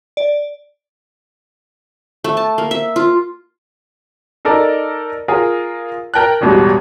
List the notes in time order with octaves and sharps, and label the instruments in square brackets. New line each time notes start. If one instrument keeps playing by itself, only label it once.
[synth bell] D5
[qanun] A3
A5
A#3
E5
F4
[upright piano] D#4 A4 A#4 D5
F4 G#4 A#4
A#4 G5 A5 F#6
E1 A1 B2 G3 G#3